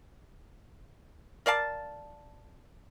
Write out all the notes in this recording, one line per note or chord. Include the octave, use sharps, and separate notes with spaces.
A#4 D5 F5 A5